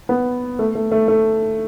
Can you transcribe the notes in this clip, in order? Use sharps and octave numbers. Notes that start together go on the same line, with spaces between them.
B3
A3
A3
A3
A3